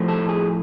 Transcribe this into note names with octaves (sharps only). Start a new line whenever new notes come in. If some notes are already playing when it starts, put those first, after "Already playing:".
Already playing: A2 F3 A3
A4
G#4